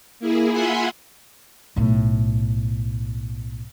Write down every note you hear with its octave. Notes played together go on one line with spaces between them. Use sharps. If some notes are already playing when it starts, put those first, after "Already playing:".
A#3 E4 G#4
F4 E5 F#5 G#5 B5 C6
B1 A2